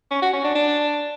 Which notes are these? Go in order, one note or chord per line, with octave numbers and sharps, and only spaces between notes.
C#4
F#4
C#4
D4
D4